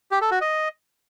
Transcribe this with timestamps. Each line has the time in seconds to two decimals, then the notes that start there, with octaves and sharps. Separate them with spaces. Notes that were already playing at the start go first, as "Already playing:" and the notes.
0.11 G4
0.21 A4
0.31 F#4
0.41 D#5